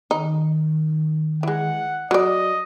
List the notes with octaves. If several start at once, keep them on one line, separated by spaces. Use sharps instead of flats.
D#3 D#4
E3 G#3 F#5
F#3 D5 D#5